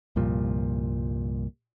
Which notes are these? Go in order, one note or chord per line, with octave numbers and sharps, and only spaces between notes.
C2 G2 A#2 F3